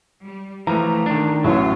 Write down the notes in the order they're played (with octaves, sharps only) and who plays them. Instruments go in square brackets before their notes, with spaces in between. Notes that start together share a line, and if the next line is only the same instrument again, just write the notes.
[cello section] G3
[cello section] A2 A3 [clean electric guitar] E3 F3 [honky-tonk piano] A#5
[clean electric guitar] D#3 D4
[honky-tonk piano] A1 A2 [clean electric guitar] F#3 [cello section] B3 F4